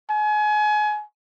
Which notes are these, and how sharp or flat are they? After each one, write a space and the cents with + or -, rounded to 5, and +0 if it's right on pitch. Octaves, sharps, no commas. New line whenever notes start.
G#5 +30